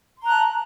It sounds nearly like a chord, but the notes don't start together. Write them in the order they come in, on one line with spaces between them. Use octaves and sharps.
C6 A#5 F#6 A5